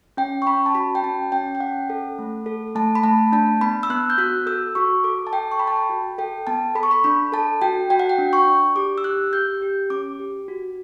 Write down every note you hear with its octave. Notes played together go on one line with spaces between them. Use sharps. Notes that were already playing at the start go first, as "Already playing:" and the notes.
C#4 G5
C#6
C#4 B5
A5
F#4 B5
G5
C#4 A5
C#4 G5
G5
C#4 F#5
A4
A3
A4
A3 A5
B5
A3 A5
D4 A5
B3 B5
E6
B3 F#6
G6
F#4 F#6
A4 E6
F#4 C#6
A4 D6
A5
A4 G5
C#6
A4 B5
A5
G5
F#4
A4 G5
B3 A5
A4 B5
C#6
B5
D4 B5
A4 A5
F#4 G5
F#4 G5
F#5
G5
D4
C#6
D4
G4 D6
E6
G4 F#6
G4 G6
G4
C#4 D6
G4
F#4